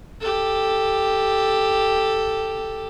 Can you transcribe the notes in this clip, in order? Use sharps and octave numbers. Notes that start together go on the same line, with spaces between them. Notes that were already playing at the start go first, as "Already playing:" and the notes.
G4 A4